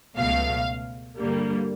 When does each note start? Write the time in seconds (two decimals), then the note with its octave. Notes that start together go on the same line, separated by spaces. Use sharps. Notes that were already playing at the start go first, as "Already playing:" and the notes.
0.16 C#2 B2 F#3 A3 F5
1.17 G2 D3 G3 A#3